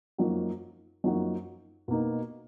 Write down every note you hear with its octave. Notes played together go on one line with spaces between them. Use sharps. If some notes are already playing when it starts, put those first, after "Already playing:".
F#2 F3 A#3 D#4 F#4
F#2 F3 A#3 D#4 F#4
B2 A#3 D#4